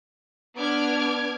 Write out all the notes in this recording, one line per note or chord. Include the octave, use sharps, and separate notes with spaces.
B3 D4 D6 F6 G#6